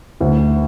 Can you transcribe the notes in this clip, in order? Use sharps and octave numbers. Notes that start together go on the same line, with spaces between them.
D2